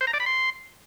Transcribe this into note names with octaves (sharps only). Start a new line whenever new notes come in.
C5
A#5
D5
B5
C6